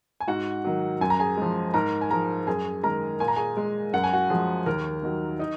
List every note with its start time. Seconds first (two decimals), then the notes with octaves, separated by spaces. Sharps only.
0.20 G#5
0.28 G#2 F#4 F#5
0.65 D#3 F#3
1.01 F#2 G#5
1.10 A#5
1.19 G#4 G#5
1.37 F3 G#3
1.74 G#2 A#4 A#5
2.01 G#5
2.10 F3 G#3 A#4 A#5
2.47 F#2 G#4 G#5
2.83 D#3 G#3 A#4 A#5
3.20 A#2 G#5
3.28 A#5
3.36 G#4 G#5
3.57 G#3
3.93 F#2 F#5
4.04 G#5
4.13 F#4 F#5
4.30 F3 G#3 G#4
4.66 D#2 A#4
5.03 D#3 F#3
5.39 D#4 D#5